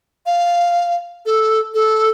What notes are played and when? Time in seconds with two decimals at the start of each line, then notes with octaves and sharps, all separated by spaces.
0.26 F5
1.26 A4
1.74 A4